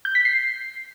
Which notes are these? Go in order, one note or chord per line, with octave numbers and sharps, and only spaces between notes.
G6
B6
C7